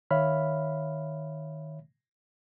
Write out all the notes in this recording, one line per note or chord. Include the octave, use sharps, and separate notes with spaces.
D#3 C#5 E5 F5 B5 F6